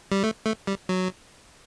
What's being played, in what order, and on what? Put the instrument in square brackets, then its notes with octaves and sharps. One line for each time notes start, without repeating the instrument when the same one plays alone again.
[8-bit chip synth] G3
A3
A3
G3
F#3